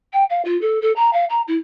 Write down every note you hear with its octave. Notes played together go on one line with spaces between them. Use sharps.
G5
F5
F4
A4
A4
A#5
F5
A#5
E4